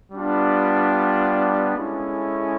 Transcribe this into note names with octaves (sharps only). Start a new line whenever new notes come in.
G3 B3 D4 F4
G#3 C#4 E4 A4